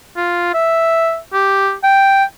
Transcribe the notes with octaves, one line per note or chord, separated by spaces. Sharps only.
F4
E5
G4
G5